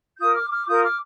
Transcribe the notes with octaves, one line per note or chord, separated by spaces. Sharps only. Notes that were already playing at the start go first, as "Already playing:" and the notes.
F4 A#4 D#6 G6
D6 F6
D6 F6
F4 A#4 D#6 G6
D6 F6